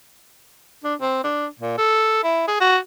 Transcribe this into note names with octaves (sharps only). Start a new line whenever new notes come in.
D4
C4
D4
A#2
A4
E4
G#4
F#4